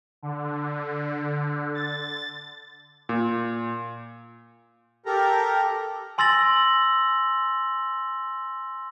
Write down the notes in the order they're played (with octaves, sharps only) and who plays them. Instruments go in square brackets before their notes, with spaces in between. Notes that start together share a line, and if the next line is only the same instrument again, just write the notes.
[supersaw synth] D3
A6
[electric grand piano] A#2
[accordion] G4 A4 A#4 A#5
[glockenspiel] G#5 C6 E6 A6 A#6 F#7